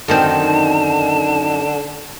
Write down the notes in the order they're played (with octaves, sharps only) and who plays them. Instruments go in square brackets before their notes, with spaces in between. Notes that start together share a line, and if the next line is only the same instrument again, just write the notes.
[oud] F#2 D#3 C4 [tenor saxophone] D3 [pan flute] A5